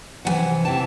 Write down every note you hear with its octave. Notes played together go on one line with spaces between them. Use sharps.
E2 C3 E3 F#5 G#5
C3 E3 G5 A5